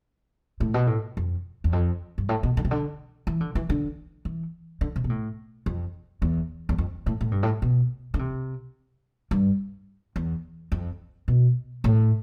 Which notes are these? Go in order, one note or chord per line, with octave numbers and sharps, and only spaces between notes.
A2
B2
A2
F2
E2
F2
G2
A2
B2
D3
C3
D3
E3
D3
E3
D3
E3
D3
C3
B2
A2
F2
E2
E2
F2
A2
A2
G2
A2
B2
D3
C3
G2
E2
F2
B2
A2